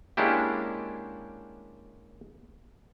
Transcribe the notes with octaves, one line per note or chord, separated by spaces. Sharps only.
G#3 A#3 C#4 D4 E4 G4